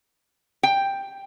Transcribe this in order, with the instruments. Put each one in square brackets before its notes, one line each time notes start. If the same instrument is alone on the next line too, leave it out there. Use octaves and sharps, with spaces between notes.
[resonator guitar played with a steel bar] G5